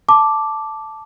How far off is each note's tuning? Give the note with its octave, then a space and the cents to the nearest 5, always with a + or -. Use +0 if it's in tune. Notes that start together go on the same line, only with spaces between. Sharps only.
A5 +0 D6 +0